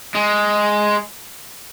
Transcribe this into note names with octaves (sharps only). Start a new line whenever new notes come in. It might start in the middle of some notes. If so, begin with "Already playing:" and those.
G#3